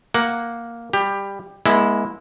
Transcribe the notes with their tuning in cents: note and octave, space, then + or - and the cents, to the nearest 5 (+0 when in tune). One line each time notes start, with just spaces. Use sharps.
A#3 +0 F#5 +0
G3 +15 G4 +15
G#3 +0 B3 -45 E4 -10